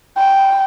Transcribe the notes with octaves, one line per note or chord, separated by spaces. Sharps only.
G5